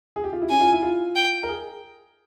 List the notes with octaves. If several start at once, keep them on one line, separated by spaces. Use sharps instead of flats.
G#4
G4
F4
E4
C#4 G#5
F4
E4
F4
G5
A#4
G#4